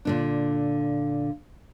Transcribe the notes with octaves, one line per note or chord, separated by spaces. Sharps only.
A#2 D3 D4